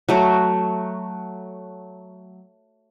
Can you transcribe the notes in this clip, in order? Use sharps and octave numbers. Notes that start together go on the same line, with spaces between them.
F#3 A3 F#4